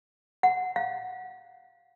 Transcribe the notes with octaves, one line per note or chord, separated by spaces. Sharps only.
F#5
F5